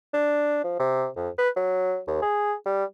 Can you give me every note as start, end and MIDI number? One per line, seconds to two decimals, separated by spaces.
0.14 0.63 62
0.64 0.77 53
0.79 1.07 48
1.16 1.30 41
1.38 1.49 71
1.56 1.99 54
2.07 2.20 39
2.22 2.54 68
2.66 2.84 55